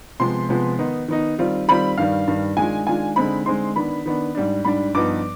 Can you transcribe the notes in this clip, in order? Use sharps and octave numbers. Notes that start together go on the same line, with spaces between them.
C3 F3 G#3 B3 C6
C3 F3 G#3 B3
D#3 B3 D#4
D#3 B3 D#4
D#3 G3 C4 F4
D#3 G3 C4 F4 B5
G2 D#3 G3 F5
G2 D#3 G3
D#3 G#3 D4 F4 G#5
D#3 G#3 D4 F4 G#5
D3 G#3 C4 D#4 B5
D3 G#3 C4 D#4 C6
D#3 B3 D4 B5
D#3 B3 D4
G#2 G3 D4
G#2 G3 D4 B5
G2 F3 B3 D#4 D6